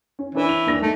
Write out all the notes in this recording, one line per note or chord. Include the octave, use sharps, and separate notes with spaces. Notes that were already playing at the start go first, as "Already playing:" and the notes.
C#4
E3 C#4 D4 B4
F7
D#2 D4 A#6
G#2 A3